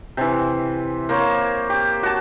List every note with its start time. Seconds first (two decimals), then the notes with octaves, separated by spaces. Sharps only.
0.17 C3 E3
1.09 A#3 C5 C#5
1.69 G4
2.03 F#4 A5